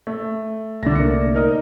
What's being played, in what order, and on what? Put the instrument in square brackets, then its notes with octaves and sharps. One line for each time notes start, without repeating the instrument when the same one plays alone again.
[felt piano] A3
[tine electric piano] C2 A3 D5 [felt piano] D3 A#6
[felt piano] A#3 C#7
D#4 A#4 D#5